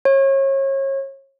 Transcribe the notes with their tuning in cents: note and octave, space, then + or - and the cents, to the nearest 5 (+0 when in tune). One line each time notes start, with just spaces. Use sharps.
C#5 -30